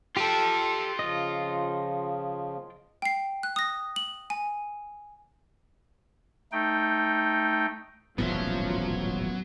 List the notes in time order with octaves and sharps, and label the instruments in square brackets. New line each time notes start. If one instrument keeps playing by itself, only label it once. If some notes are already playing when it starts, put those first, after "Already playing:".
[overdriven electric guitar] F4 G5 [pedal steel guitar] G4 A4
[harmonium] C#3 F3 [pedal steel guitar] D#5
[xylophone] G5 C7
F#6
D#6 A#6
F#7
G#5
[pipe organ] A3 D#4 G5
[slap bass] D#1 A1 G#2 [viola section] F3 [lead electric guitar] F#3 [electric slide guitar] B3 C#4 E5